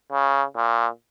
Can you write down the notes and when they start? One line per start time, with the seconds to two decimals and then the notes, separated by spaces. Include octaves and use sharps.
0.12 C#3
0.56 A#2